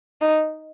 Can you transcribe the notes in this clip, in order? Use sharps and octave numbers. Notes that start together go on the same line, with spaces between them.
D#4